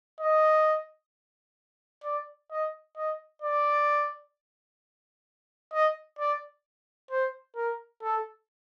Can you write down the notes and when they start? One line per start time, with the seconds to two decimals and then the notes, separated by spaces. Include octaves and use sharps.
0.21 D#5
2.04 D5
2.51 D#5
2.97 D#5
3.42 D5
5.73 D#5
6.19 D5
7.11 C5
7.56 A#4
8.03 A4